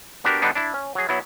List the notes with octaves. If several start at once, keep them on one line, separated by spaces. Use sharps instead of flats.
B3 D4 F#4 G4 A#4
D3 G3 B3 D4 D#4
D4 E4
C#4
F#3 G#4
F#3 B3 E4